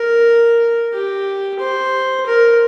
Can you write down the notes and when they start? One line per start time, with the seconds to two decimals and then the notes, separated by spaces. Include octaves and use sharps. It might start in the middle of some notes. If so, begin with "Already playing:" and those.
Already playing: A#4
0.93 G4
1.59 C5
2.26 A#4